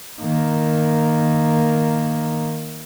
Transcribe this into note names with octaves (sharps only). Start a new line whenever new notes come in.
D#3 A#3